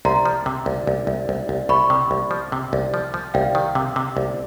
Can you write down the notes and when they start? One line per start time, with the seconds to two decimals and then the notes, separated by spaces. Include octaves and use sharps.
0.05 C2 A#5 C6
0.26 F3
0.46 C3
0.66 C2
0.87 C2
1.07 C2
1.29 C2
1.49 C2
1.69 C2 B5 C#6
1.90 C3
2.11 C2
2.31 F3
2.52 C3
2.73 C2
2.94 F3
3.14 F3
3.34 C2 F5 G5
3.55 D#3
3.75 C3
3.96 C3
4.17 C2